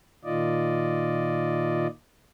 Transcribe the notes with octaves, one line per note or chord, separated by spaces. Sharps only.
A#2 D#3 F4 D5 D#5